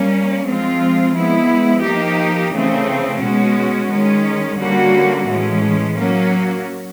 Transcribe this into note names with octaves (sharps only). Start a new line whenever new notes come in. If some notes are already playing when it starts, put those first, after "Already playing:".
Already playing: G3 A#3 C#4
F3 G#3 C4 F4
F3 G#3 B3 E4
F3 A#3 D#4 G4
C#3 E3 A3 C4
B2 G#3 C#4 F#4
D#3 G#3 C#4
D3 G3 A#3 C#4 F#4
A2 E3 G#3 C#4
F#3 A#3 C#4 F#4